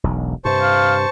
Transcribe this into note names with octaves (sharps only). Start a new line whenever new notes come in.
E1 B1
G2 C3 C5 A5 C#6
F5